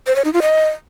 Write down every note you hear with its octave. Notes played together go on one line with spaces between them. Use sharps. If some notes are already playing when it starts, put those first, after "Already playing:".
C5
C#5
D#4
F4
D#5